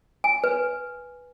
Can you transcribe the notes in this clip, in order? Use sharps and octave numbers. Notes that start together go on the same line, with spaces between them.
G#5
B4